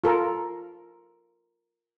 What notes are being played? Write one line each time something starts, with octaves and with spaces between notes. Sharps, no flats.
F4 A4 A#4